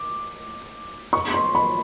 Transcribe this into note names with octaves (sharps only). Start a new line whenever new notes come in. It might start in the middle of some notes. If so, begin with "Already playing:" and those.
Already playing: D6
C#6
C6
B5